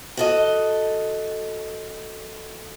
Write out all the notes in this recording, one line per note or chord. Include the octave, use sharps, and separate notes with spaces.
F#4 A4 D#5